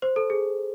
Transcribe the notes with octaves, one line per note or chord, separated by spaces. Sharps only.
C5
A4
G#4